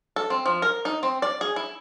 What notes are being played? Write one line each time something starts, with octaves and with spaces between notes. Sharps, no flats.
A4
C4
F3
A#4
D#4
C4
D5
G#4
E4